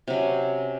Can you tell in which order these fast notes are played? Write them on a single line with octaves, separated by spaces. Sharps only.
C3 F#3 C#4